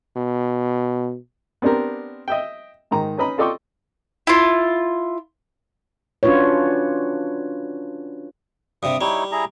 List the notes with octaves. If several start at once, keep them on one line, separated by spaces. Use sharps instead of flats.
B2
B3 C4 D4 G4 A#4
D#5 E5 G5
G#2 D#3 A#5
C#4 D#4 B4 D#5 A#5 B5
F4 A4 D5 D#5 G5 C#6
E4 F4
C#4 D4 F4 F#4 B4 C#5
G2 C3 D#6
G3 D#4 E4 C#5
E4 G#4 A#5